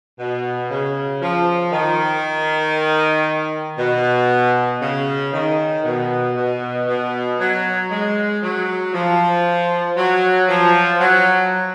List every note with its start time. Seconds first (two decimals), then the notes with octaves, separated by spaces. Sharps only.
0.19 B2
0.70 C#3
1.22 F3
1.72 D#3
3.78 B2
4.82 C#3
5.33 D#3
5.85 B2
6.36 B2
6.87 B2
7.39 F#3
7.91 G#3
8.43 F#3
8.93 F3
9.97 F#3
10.49 F3
11.00 F#3